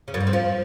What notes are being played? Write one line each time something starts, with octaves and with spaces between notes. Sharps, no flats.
C#3
F#2
G2
C4
F3